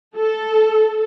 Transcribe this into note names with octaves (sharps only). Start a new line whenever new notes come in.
A4